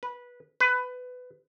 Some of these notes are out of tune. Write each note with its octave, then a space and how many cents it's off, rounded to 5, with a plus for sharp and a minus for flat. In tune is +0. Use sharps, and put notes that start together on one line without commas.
B4 -15
B4 +20